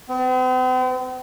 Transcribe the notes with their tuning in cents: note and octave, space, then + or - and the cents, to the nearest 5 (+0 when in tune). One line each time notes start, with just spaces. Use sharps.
C4 -45